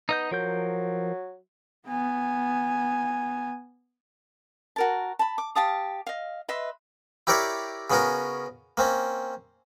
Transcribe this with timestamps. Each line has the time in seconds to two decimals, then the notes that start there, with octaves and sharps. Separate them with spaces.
0.09 B3 D#4 D#5 G6
0.31 F3 F#3 A#4 G6
1.87 B3 G#5
4.76 F#4 A#4 A5
5.19 A5 B5
5.38 D6
5.55 G4 F5 A5 D#6
6.07 D#5 F5
6.49 B4 D#5 E5 C6
7.27 E4 G4 A#4 C#5 D5 E5
7.90 C#3 B3 C#4 F#4 A#4
8.77 A#3 C4 C#4